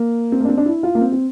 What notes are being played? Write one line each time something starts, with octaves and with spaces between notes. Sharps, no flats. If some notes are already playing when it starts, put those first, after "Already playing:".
Already playing: A#3
C4
A#3
D4
C4
D4
E4
F4
A#3
C4
C4